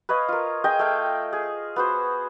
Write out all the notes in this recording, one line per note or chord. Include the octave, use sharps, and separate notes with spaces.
B4 C#5 D#5 F5
F4 A#4
G#4 D#5 G5 G#5
A3 F5 G5
G#4
B3 F#4 C5